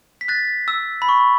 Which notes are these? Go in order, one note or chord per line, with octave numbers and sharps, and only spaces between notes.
B6
F#6 A6
E6
B5
C#6